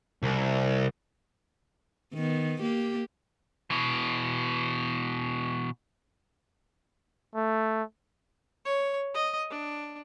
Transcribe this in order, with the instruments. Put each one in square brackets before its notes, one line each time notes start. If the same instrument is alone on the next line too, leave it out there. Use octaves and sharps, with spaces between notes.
[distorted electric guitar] C2
[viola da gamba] D#3 B3
A#3 G4
[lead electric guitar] B2 E3
[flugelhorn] A3
[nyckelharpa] C#5
D#5
D4